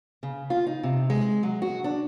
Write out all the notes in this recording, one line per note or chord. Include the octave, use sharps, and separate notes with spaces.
C#3
F4
D#4
C3
G#3
F#3
F#4
D4